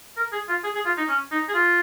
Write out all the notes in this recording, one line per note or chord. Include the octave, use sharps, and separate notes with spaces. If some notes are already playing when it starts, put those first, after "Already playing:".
A#4
G#4
F4
G#4
G#4
F4
D#4
C#4
D#4
G#4
F4